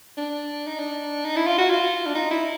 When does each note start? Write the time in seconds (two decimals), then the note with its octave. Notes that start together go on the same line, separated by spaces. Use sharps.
0.18 D4
0.67 D#4
0.79 D4
1.25 D#4
1.36 E4
1.47 F4
1.59 F#4
1.70 F4
2.07 D4
2.16 D#4
2.31 E4